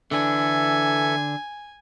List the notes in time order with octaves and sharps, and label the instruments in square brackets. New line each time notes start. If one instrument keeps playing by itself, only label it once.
[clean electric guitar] D3 D4 [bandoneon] E3 A4 E5 [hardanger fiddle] G#5